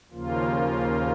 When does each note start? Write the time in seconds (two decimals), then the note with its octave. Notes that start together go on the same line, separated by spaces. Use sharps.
0.11 D#2 C#3 F3 A#3 F4